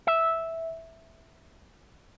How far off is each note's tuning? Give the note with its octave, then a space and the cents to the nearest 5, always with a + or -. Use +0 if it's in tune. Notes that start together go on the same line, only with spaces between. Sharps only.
E5 -5